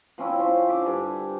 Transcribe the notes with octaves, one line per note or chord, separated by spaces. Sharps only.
F3 C4 C#4 E4
C4 C#4 C5 F5
D3 E5 D6
G2 G#5 A5